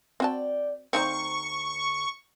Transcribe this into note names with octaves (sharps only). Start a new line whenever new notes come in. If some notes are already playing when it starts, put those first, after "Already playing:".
C4 F#4 D5 G5 A5
D2 C4 D#4 C5 F5 A#5 C#6